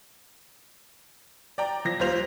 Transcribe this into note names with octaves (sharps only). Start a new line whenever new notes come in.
D5 G5 A#5
F3 A#6
D#2 G3 F4 C5 F7